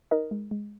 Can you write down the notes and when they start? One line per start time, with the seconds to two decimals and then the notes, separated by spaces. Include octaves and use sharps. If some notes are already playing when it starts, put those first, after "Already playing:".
0.11 D#4 A#4 D#5
0.31 G#3
0.51 G#3